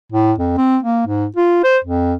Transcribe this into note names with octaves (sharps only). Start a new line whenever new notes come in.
A2
F2
C4
A#3
G#2
F4
C5
F2